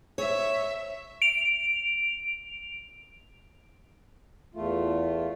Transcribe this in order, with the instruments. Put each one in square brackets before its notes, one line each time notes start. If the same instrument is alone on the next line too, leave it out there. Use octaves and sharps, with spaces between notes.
[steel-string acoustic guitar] C#5 [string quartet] E5
[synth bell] D7 F7
[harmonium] E2 A3 F4